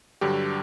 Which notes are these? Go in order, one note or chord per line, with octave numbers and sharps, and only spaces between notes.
G2 D3 F#3 G4